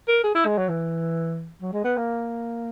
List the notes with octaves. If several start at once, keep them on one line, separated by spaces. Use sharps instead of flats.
A#4
G#4
E4
G#3
F#3
E3
F#3
G#3
B3
A#3